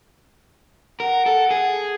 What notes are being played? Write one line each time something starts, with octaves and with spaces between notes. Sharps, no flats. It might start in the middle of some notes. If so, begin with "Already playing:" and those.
A#4 F#5
A4
G#4